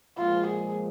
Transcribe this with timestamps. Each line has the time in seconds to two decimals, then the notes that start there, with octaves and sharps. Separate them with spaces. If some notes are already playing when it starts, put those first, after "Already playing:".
0.18 A#2 F3 G#3 F4
0.47 G#4